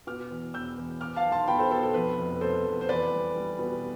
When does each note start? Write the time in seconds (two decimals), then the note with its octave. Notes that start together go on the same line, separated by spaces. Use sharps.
0.07 B2 D6 F6
0.30 E2
0.54 E1 E6 G6
0.77 E2
1.01 B3 D6 F6
1.16 F5 A5
1.25 B1
1.32 A5 C6
1.48 B2 G5 B5
1.59 A4 C5
1.71 B2 A4 C5
1.83 A4
1.94 F2 B4
2.18 F1
2.41 B3 A4 C5
2.65 F1
2.81 C5
2.89 E2 B4 D5
3.12 G3
3.36 G3
3.59 B2